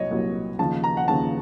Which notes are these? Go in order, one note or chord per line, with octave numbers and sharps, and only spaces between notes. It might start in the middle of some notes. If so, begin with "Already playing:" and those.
Already playing: C2 A#2 F#3 C#5 D#5
C2 A#2 F#3
D#2 C#3 F3 A5
A#5
F#5
D#2 C#3 F3 A5